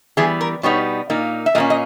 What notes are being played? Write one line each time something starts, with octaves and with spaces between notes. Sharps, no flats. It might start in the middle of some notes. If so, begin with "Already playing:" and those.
E3 G3 B3 G#4
A#4
B2 G3 B3 D#4 C#5
A#2 A#3 D#4
E5
A#2 A#3 C#4 D#5
D#5